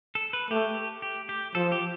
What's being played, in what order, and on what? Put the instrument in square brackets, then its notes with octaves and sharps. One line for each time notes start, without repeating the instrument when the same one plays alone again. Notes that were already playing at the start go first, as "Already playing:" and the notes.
[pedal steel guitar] A4
B4
[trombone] A3 [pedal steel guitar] G4
[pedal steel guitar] G4
G4
[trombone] F3 [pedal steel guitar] A4
[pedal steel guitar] G4